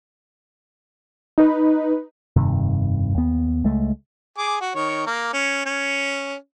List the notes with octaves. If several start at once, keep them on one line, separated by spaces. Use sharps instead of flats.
D#4 B4
F1 G2 C3 D#3
D#2 B3
C#2 G#3 A3
G#4 D6
F#4
D#3 C#5
A#3
C#4
C#4